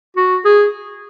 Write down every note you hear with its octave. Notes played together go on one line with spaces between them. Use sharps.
F#4
G#4